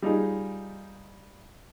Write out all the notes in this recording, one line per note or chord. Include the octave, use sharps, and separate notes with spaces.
G3 D#4 F4 G#4